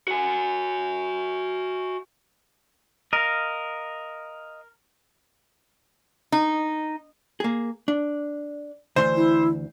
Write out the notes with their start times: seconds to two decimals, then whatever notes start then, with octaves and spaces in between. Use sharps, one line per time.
0.08 F#4 G#5
3.13 A#4 D#5 F5
6.32 D#4
7.40 A#3 G#4
7.88 D4
8.96 D2 E3 C5 C6
9.15 E4